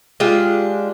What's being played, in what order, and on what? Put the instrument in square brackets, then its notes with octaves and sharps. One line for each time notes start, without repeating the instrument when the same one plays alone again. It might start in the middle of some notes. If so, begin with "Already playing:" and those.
[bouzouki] G#3 D4 F4 G4